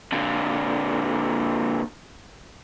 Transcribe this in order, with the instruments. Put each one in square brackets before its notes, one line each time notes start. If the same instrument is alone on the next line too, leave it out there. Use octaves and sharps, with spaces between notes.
[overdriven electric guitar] A#2 D3